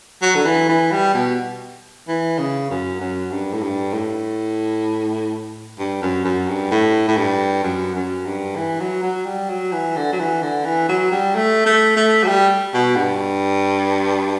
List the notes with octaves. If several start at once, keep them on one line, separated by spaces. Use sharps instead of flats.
F#3
D3
E3
E3
G3
B2
E3
C#3
F#2
F#2
G2
A2
G2
A2
G2
F#2
F#2
G2
A2
A2
G2
F#2
F#2
G2
E3
F#3
F#3
G3
F#3
E3
D3
F#3
E3
D3
E3
F#3
G3
A3
A3
A3
F#3
G3
B2
G2